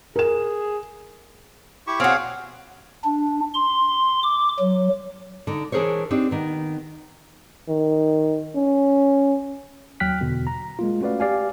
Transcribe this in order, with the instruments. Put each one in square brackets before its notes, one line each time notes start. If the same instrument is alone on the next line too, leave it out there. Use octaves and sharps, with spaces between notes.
[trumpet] G#4 [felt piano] A#4 E7
[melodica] E4 G4 C#6
[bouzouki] C4 F#4 [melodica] G#4 C#5 F5
[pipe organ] D4
C6
D6
F#3
[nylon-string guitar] D3 D#4
E3 D4 G#4 A#4 C5 C#5
C4 D4 D#4 G4
D#3 B3
[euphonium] D#3
C#4
[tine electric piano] D#2 F#3 G5 F6 F#6 B6
E2 B2 D3
A#5
G#3 A#3 F4
A3 C#4 F#4 B4 D5 F5
G4 D5 F5 G#5